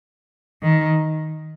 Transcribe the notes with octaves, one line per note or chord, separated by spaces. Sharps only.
D#3